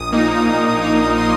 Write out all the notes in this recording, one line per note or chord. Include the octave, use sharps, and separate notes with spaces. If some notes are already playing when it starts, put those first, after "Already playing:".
Already playing: A#1 D#6
A#2 A#3 D#4
A#1
A#2 A#3 D#4
C6